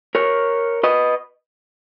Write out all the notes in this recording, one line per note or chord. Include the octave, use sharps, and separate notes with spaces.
A#4 C#5
B4 D#5